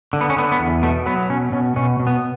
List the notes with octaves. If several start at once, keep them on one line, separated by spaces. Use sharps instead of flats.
D3
B3
C#4
D3 B3
B3
E2
B2 A3
F#3 B3
B2 C#4
B2 C#4
B2 C#4
B2
B3